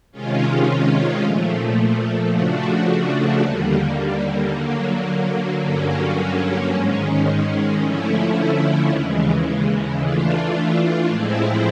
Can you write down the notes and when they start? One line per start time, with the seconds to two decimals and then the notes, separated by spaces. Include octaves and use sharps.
0.12 C3 D#3 G#3 C#4 F4
1.20 A#2 F3 A3
2.31 C#3 F3 A3 D4 F#4
3.40 D#2 D3 G3 A#3
4.50 D3 F#3 A#3
5.60 G2 D3 F#3 A#3 C#4
6.69 G#2 D#3 G#3 C#4
7.79 D3 F3 A3 C#4 E4
8.89 D#2 C#3 E3 G#3
9.98 E3 A3 D4 F4
11.08 A2 F3 G#3 C4 E4